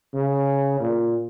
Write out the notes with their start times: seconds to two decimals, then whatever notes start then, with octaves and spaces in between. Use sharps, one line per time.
0.13 C#3
0.80 A#2